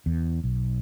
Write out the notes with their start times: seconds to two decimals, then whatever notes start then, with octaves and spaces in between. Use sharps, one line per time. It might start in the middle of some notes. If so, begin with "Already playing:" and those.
0.06 E2
0.44 B1